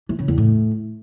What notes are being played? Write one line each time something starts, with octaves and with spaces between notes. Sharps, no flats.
E3
C#3
E2
A2